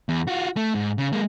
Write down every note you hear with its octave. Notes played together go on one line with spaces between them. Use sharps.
E2
F4 F#4
A3
G#2
C#3
G#3 A#3